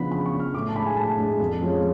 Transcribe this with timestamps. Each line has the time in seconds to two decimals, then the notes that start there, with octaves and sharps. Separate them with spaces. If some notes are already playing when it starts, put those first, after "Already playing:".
Already playing: C#3 F3 B3 D4 B5
0.12 C#3 B5
0.26 C#6
0.32 F3 B3 D4
0.40 F6
0.54 A2 D6
0.68 A5
0.75 G#3 D4 B5
0.86 G#5
0.97 A2 A5
1.18 G#3 D4
1.40 F2
1.61 F3 G#3 C#4